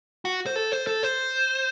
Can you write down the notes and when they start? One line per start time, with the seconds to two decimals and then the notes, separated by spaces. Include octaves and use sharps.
0.25 F#4
0.46 C5
0.56 A4
0.72 C5
0.87 A4
1.03 C5